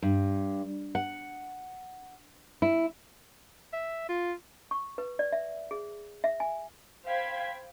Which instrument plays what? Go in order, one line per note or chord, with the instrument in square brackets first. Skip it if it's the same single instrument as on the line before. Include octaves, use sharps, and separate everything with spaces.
[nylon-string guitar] G2
F#5
E4
[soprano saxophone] E5
F4
[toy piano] C#6
B4
D5
E5
G#4
E5
G#5
[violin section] C5 F5 G5 B5 G#6 B6